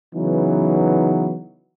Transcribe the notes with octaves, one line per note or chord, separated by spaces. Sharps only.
C#3 E3 F#3 B3 D#4